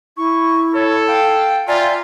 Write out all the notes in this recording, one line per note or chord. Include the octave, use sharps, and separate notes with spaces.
E4 C#6
A4 C#5
F5 G5
F4 D5 E5 G5 G#5 A#5